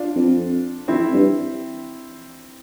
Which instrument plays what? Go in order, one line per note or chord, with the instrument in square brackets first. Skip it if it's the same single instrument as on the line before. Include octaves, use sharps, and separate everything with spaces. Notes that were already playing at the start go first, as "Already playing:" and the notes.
Already playing: [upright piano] D4 F4
[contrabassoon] F2
[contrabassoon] F2 [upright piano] C4 E4
[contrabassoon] G2